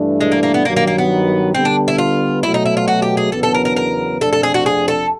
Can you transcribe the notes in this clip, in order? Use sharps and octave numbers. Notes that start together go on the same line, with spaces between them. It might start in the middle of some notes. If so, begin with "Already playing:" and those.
Already playing: G2 E3 A3 D4
G#3
A#3
A#3
B3
G2 D#3 F#3 A#3
A#3
A#3
B3
D3 G3 B3 C4
D4
E4
F4
B2 F#3 A3 E4
D#4
E4
F4
F#4
G4
G#4
E2 C#3 F#3 B3 D4 A4
A4
A#4
A#4
A#4
F2 C3 F3 A3 D4 A4
A4
G#4
F#4
G#4
A4